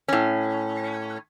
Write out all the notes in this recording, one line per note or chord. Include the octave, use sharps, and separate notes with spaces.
A2 C#4